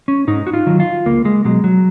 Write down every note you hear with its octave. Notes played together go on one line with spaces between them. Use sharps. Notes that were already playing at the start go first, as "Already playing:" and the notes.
C#4
G#2 D#4
F#4
F4
D#3 F#3
F4
C#2 A#3
G#3
B2 F#3 G#3
F#3